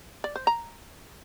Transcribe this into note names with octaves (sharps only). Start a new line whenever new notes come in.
D5
C5
A#5